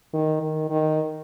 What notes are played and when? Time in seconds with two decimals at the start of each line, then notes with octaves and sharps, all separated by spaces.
0.14 D#3
0.42 D#3
0.70 D#3